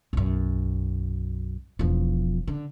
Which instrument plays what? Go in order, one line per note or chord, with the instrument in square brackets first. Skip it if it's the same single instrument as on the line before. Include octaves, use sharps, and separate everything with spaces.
[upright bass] B1 F#2
E1 F3
D3